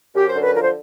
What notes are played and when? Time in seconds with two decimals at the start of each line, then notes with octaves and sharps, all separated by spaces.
0.15 F#2 G4
0.28 C5
0.35 D3
0.42 B4
0.55 F3 A#4
0.63 C5